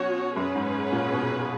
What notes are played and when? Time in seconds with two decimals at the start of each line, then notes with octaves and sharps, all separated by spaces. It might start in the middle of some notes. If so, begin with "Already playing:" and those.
Already playing: B2 F#3 C#4 F#4 C#5
0.36 F#2 C#4 G#4 B4
0.55 G#2
0.92 A#2
1.12 B2